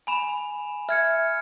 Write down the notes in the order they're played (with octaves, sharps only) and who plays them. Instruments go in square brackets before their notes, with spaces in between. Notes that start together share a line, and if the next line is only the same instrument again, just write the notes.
[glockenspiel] G#5 B5 E7
[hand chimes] E5 [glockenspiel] F6 G#6 C#7